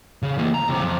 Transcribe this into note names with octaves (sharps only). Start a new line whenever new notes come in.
C#3
E3 A#3
A#5
C#2 C3
F2